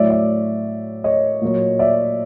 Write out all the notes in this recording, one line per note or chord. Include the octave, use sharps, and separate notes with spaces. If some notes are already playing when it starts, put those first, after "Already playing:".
Already playing: A2 F#3 D5 E5
D5 E5
C#5 D#5
A#2 F#3
D5 E5